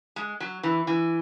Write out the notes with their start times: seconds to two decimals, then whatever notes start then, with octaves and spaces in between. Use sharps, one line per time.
0.16 G#3
0.40 F#3
0.63 E3
0.87 E3